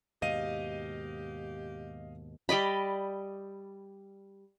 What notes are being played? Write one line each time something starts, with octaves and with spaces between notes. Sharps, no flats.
D#2 G#2 B2 G4 D#5 F5 D#7
G3 D5 D#5 B5